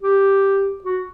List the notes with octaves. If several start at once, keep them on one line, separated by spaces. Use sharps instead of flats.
G4
F#4